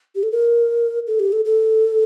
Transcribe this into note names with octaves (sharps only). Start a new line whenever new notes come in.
G4
A4
A#4
A4
G4
A4
A4